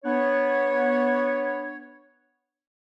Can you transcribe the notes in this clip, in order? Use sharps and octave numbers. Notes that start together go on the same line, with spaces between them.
B3 D4 C#5